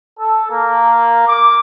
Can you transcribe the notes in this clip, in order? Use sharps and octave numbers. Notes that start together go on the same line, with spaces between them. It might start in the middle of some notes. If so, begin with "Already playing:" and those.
A4
A#3
D6